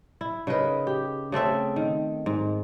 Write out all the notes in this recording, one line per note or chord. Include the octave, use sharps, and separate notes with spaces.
E4
C#3 D#4 A#4 B4
G4
C#3 A3 C4 E5
D#3
G#2